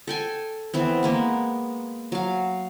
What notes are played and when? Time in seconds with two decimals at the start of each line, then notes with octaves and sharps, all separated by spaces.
0.07 A4 G5 G#5
0.74 E3 B3 C4
1.03 G#3 A#3 B3
2.12 F#3 F5